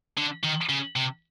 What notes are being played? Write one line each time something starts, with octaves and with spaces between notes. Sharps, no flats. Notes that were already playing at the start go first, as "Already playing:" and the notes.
D3
D#3
C#3
C3